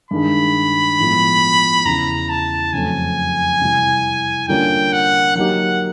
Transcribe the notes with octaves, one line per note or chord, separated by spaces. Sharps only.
G2 D#3 G#3 B5
A2 F3 G#3 B3
E2 C#3 E3 A#5
A5
F2 C#3 F#3 A3 C4 G#5
C3 E3 G3
D3 G3 A#3 C#4 F4 G5
F#5
F#3 A#3 D#4 G4 F#5